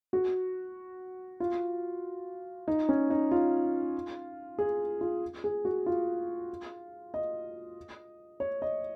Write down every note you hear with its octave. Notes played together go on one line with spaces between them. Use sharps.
F#4
F4
D#4
C#4
D#4
F4
G#4
F4
G#4
F#4
F4
D#5
C#5
D#5